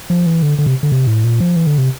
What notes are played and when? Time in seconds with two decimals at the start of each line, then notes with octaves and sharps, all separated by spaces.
0.10 F3
0.26 E3
0.42 D3
0.58 D3
0.66 C3
0.83 D3
0.92 C3
1.07 A2
1.24 A#2
1.40 F3
1.56 E3
1.67 D3
1.78 C3